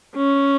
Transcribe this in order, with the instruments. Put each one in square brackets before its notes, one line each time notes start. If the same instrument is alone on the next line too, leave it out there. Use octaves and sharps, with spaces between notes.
[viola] C#4